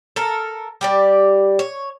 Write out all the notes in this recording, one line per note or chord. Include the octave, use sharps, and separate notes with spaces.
A4 A#4
G3 G4 D5
C#5